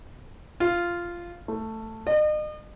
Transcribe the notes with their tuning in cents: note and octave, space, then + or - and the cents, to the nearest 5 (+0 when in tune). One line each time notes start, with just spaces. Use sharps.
F4 -10
A3 +10
D#5 -40